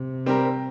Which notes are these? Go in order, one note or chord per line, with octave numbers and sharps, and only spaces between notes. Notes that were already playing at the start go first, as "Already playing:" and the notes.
Already playing: C3
G3 C4 G4 A#4